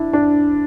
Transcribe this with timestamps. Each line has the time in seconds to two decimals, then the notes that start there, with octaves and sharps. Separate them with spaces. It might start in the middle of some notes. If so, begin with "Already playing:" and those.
Already playing: D4 E4
0.13 D4